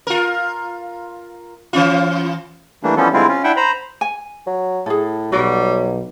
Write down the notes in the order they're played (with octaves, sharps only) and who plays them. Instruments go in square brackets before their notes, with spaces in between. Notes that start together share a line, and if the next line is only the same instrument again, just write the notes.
[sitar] F4 A#4
E3 C#4 F4
[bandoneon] E3 G3 A3 A#3 D4
E3 F3 G3 B3 C#4 A4
D3 G3 G#3 C4 E4 F4
C#4 F4
D4 E4 E5 F#5 G5
C5 A#5 B5
[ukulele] G#5
[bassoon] F#3
[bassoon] A2 [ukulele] G#4 A4
[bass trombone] B1 [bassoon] F#3 [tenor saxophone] G3 [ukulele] F#4 D5